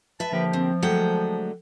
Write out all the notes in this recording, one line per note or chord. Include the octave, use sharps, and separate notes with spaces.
B4 E5 A5
D3 F3 A#3 G4
C4
D3 F#3 G#3 A3 F#5 G5